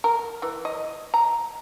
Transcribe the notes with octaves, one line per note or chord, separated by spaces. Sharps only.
A#4
E3
D#5
A#5